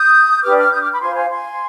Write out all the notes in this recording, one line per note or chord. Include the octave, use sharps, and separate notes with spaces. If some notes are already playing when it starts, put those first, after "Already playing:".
Already playing: D#6 G6
D4 G4 B4 D6 F6
D6 F6
D#6 G6
D6 F6
B5 D6
F4 C5 G#5 C6
F5 G#5
G#5 C6